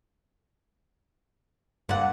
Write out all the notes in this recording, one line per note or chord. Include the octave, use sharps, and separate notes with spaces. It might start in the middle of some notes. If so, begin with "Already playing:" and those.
G2 A#2 F5 F#5